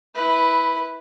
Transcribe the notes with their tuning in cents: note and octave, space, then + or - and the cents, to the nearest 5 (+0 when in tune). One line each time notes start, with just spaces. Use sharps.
E4 -15 B4 +0